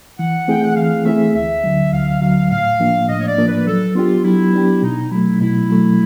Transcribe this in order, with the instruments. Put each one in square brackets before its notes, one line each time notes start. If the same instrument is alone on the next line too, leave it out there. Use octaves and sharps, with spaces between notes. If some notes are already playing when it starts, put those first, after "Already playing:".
[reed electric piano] E3 [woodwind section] F#5
[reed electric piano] A3 C4 E4 G#4 [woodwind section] G5
[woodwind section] F#5
[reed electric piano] E3 [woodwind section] F5
[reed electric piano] A3 C4 E4 G#4 [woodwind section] E5
[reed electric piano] D2 [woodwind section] E5
[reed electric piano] D3 F#3
[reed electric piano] D2 [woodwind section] F5
[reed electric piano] D3 F#3 [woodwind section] F5
[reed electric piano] A2 [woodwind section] F5
[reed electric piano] F3 A#3 D4
[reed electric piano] A2 [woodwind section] D#5
[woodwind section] C#5
D5
[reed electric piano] F3 A#3 D4
[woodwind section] B4
[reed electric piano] F#3 [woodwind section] A4
[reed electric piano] B3 D4 G4 [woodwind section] F4
[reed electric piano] F#3 [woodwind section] E4
[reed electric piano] B3 D4 G4
[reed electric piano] B2 [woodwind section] D#4
[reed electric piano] F#3 A3 [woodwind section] E4
[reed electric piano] B2 [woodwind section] E4
[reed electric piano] F#3 A3